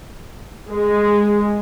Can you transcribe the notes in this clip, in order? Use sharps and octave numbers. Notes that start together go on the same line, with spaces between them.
G#3